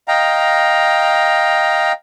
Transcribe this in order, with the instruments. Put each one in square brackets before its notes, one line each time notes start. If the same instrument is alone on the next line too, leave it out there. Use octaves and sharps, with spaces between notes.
[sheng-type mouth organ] D#5 F5 G5 A#5